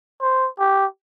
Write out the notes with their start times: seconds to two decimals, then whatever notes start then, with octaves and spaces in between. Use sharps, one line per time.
0.22 C5
0.59 G4